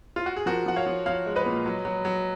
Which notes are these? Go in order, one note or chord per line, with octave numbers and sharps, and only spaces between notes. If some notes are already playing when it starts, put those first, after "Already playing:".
F4
F#4
G#4
F3 F#4 A#4
F3 F#5
C#5 F5
F3
F3 C#5 F5
G#3
B4 D#5
A#2
F#3
F#3
F#3